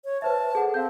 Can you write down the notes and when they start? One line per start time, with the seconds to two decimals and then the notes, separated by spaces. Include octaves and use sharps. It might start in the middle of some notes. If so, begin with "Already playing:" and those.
0.05 C#5
0.22 B4 C5 E5 A5
0.55 G#4 A4 F#5
0.74 C4 F5 G6